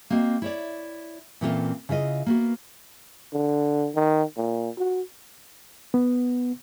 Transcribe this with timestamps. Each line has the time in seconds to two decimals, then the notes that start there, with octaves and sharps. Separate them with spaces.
0.10 A#3 C4 F#4 D#5
0.42 E4 C#5 D5
1.41 A#2 E3 C4 C#4 F4 A4
1.89 C#3 E4 F4 D#5
2.26 A#3 B3 F#4
3.33 D3
3.95 D#3
4.37 A#2
4.78 F#4
5.94 B3